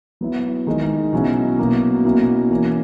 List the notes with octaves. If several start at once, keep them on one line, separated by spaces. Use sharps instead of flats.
F#3 B3 E4
D#3 G#3 D#4
B2 F#3 C#4 E4
B2 F#3 A#3
B2 A#3 C#4 E4
E3 A#3 C#4 E4